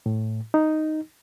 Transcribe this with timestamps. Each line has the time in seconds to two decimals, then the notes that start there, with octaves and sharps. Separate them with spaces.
0.06 A2
0.54 D#4